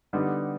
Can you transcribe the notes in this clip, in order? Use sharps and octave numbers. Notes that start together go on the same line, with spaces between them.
D3 G3 B3 D#4